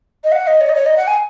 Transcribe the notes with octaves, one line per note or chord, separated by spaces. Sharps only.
D#5
F#5
D#5
C#5
D#5
C#5
D#5
F#5
G#5